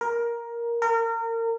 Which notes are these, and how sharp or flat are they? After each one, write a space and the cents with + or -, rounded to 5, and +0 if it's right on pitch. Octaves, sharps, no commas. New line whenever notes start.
A#4 +10
A#4 -30